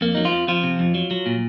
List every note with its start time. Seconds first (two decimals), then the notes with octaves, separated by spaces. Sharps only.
0.01 F2 A#3
0.15 F#3 D#4
0.25 F3 F4
0.32 F2
0.47 F2 F3 F4
0.63 C3
0.79 F2
0.95 F#3
1.11 F#3
1.26 A#2